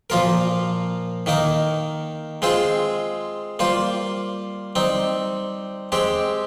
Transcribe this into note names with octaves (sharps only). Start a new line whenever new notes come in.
A#2 F3 A#3 F4 A#4
D#3 A#3 D#4 A#4
G#3 C4 F4 G#4 C5
G3 A#3 F4 C5
G3 C4 D#4
G#3 C4 G4